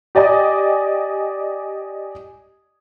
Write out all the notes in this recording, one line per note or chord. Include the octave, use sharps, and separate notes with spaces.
G4 D5 D#5 G#5